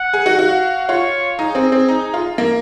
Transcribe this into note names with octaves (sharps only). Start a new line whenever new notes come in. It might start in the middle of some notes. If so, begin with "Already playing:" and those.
Already playing: F#5
G#4
F#4
F#4 F5
F4 C#5
D#4 G#4
C4
C4
D#4
F4
A#3